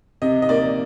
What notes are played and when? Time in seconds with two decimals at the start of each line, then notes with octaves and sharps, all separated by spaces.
0.22 C3 D#5
0.42 D#5
0.49 A#3 D5